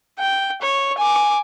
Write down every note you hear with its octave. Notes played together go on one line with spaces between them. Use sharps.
G5
C#5
G#5 D6